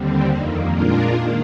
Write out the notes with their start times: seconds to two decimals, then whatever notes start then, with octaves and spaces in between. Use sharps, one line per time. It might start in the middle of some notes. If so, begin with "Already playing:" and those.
Already playing: D#2 D3 G3 C4
0.30 F2 D#3 A#3
0.71 A#2 G#3 D4 F4 A#4
1.11 D#3 A#3